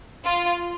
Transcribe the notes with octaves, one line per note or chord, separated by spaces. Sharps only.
F4